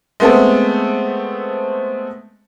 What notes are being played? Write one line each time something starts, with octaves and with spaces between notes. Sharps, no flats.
G#3 A3 B3 C4 A4